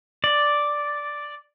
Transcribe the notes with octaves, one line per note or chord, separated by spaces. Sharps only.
D5